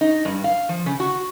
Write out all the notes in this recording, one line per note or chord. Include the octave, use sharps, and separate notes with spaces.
D#4
G2
F5
F3
C#3
F#4